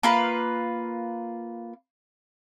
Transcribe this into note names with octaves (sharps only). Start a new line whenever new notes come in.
A#3 F4 B4